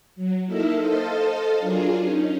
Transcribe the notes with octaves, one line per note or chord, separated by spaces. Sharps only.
F#3
A#3 D#4 E4 A4 A#4 E5
A4 C5 D#5 F5 A5
F#3 D4 F4 G#4 A#4
C#4 D#4